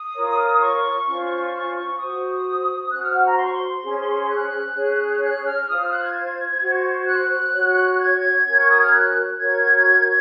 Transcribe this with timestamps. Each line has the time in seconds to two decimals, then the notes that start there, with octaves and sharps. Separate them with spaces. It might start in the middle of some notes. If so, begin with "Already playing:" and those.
Already playing: D#6
0.14 F4 A#4 C#5
0.60 C#6
1.06 C#4 F4 C5
1.53 C#6
1.76 C#6
1.99 F#4 C5 D#6
2.91 C#4 F#4 C5 F#6
3.03 F6
3.14 F#5
3.25 A#5
3.37 C6
3.45 C#6
3.53 C6
3.84 C#4 G#4 C5
4.30 F#6
4.76 C#4 G#4 C#5
5.22 F#6
5.45 F6
5.68 F4 C5 D#6
5.80 F6
5.91 F#6
6.03 G#6
6.61 F#4 C5
7.07 F#6
7.53 F#4 C#5
8.00 G#6
8.46 C#4 F#4 A#4 C#5
8.56 C#6
8.68 D#6
8.81 F6
8.92 F#6
9.38 F#4 A#4 C#5 G#6